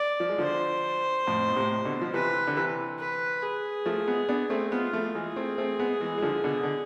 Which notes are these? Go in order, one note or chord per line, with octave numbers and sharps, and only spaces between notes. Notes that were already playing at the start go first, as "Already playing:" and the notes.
Already playing: D5
F3
G#3
D3 F3 C5
F2 A2
B2
A2 C3
B2 D3
F3
C3 E3 B4
D3
C3 E3
B4
G#4
F3 A3
G#3 B3
B3 D4
A3 C4
G#3 B3 F4
F3 A3
E3 G#3 G#4
A3 C4
A3 C4
G#3 B3
E3 G#3
G#3
D3 F3
B2 D3
D3